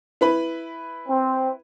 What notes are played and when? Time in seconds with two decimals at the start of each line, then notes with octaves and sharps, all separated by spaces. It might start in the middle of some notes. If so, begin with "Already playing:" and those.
0.21 E4 B4 B5
1.08 C4